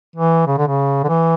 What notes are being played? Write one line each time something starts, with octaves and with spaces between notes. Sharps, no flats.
E3
C#3
D3
C#3
D3
E3